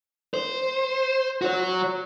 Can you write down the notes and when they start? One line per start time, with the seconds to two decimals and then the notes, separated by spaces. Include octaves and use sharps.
0.34 C5
1.42 F#4 C#5